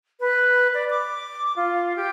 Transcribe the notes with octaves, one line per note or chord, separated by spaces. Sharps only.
B4
D5
D6
F4
G4